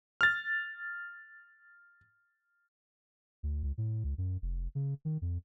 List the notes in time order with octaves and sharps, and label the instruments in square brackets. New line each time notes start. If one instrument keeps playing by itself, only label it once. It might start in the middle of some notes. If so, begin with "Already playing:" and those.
[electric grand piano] F6 A6
[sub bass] D2
C#2
A2
C#2
F#2
F1
C#3
D#3
F2